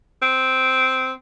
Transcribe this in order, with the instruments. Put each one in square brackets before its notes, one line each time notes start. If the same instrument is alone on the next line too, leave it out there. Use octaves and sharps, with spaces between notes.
[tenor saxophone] C4